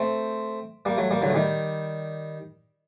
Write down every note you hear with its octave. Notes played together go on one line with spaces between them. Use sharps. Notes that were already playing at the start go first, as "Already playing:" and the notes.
Already playing: A3 C4
G3 A#3
F#3 A3
G3 A#3
D3 F#3
A3
D#3 G3